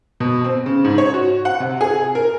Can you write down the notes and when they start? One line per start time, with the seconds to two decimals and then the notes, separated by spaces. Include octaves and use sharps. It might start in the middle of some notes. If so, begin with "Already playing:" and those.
0.20 B2
0.44 C4
0.66 C#3
0.85 G#2
0.98 C#5
1.14 F#4
1.45 F#5
1.60 C3
1.81 G#4
2.15 A#4